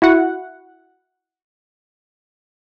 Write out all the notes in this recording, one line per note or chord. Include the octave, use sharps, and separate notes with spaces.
E4 F#4 F#5